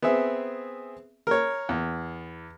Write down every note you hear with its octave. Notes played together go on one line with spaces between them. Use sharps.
B3 C4 G#4 E5
A#4 C#5
E2